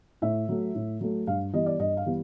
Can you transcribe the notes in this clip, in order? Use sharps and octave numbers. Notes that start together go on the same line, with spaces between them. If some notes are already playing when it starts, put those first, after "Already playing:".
A2 E5
F#3 A3
A2
F#3 A3
G2 F5
E3 G3 B3 D#5
D5
G2 D#5
F5
E3 G3 B3